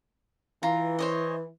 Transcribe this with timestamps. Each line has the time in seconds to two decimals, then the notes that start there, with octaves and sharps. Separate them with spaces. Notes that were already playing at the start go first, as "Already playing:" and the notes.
0.63 E3 F4 A#5
0.99 C5 C#5 D#5